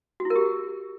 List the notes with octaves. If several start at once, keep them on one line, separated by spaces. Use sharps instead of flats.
F#4
E4
A#4
G4